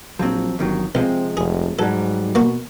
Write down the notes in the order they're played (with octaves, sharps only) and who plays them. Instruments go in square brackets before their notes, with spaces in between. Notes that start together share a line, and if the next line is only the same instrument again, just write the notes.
[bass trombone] A#1 [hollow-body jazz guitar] F3 F#3 C4
[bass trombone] G1 [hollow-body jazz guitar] F2 D#3 F#3
[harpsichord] C2 [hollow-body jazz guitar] C3 F3 G#3 [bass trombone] C4
[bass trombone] F1 [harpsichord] G#4
[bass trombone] G#2 [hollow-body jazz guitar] F#3 G3 [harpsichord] A4
[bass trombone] B2 [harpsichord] A#3 F#4